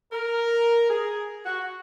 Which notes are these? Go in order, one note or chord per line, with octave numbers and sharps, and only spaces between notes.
A#4
G#4
F#4